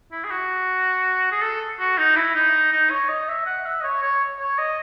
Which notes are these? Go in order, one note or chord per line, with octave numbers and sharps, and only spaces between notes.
E4
G#4
F#4
G#4
A4
F#4
D#4
E4
D#4
D#4
C#5
D#5
E5
F#5
E5
D#5
C#5
C#5
C#5
D#5